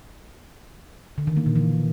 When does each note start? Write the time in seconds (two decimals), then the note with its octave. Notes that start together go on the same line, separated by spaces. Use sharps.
1.18 D3
1.27 D#3
1.37 A#3
1.46 A#2
1.56 E3